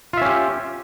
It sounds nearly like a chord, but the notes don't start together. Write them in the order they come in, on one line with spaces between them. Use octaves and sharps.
F4 E5 C#4 G4